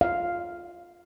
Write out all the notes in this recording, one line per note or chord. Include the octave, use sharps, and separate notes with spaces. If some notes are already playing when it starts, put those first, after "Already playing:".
F5